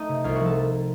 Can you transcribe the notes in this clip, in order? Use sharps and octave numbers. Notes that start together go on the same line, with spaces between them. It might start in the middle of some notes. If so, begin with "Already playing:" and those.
Already playing: A3 D#4
C3
C2 F4
F3 F#4
A4